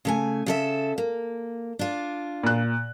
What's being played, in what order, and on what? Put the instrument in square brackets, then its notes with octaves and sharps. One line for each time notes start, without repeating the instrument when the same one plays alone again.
[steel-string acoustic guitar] C#3 A3 G#5
C#3 A4 E5
A#3
D4 F4
[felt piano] A#2 F#6